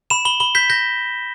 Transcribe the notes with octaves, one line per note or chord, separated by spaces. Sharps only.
B5 E7
B5 G7
B5 G7
G6 B6
G6 A#6